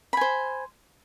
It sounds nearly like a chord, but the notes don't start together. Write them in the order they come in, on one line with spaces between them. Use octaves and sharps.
B5 G#5 C5